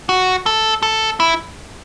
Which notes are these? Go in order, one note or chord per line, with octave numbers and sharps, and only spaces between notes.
F#4
A4
A4
E4